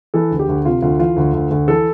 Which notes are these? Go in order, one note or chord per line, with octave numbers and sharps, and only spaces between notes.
E3 A4
D2
G4
D2
C3 F4
D2 F4
E3 F4
D2
D2
D2
E3 A4